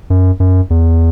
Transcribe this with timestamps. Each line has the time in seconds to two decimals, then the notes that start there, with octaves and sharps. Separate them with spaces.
0.10 F#2
0.40 F#2
0.70 E2